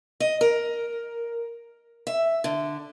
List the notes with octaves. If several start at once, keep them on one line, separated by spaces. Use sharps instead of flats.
D#5
A#4
E5
D3